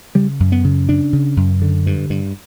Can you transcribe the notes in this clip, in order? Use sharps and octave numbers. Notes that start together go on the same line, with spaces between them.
C#3 G3
F#2
B3
C#3
C#3 D4
C#3
F#2
D3
G2
G2